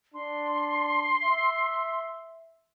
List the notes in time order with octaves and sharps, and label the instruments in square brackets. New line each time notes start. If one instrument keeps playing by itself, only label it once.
[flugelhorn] D4 [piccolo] C6
[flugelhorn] E5